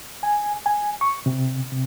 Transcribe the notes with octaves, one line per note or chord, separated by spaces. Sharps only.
G#5
G#5
C#6
C3
C3